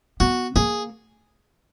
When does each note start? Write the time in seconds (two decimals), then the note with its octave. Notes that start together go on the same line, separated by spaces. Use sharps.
0.20 B3 F#4
0.56 A#3 G#4